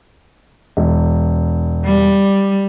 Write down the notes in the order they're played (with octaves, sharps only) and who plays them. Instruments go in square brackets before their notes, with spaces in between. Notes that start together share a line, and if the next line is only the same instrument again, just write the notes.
[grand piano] E1
[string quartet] G3